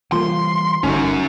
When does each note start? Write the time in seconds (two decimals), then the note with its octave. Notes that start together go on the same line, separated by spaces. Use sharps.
0.12 E3 G3 A3 A#3 F4 C6
0.83 G1 A3 C#4 D#4 F#4